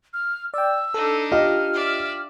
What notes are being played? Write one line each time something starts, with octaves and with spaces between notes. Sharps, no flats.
F6
D5 G5 E6
D4 D#4 A4
F4 G4 D#5 F6
D5 E5